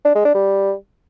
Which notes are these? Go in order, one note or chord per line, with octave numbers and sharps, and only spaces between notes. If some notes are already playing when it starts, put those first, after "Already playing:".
D4
G#3
D4
G3